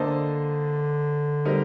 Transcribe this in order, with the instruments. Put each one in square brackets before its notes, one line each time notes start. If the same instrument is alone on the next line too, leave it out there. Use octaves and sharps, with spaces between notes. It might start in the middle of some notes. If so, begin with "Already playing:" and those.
Already playing: [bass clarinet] D3 [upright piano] A#3 D4 A4 C5 D#5
[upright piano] G3 C4 D#4 A#4